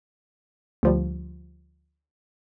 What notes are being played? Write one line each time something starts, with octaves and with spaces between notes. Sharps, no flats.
D2 F3 G3